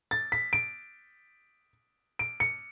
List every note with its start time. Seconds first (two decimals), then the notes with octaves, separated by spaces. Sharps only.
0.11 A6
0.32 B6
0.53 D7
2.19 D7
2.40 C#7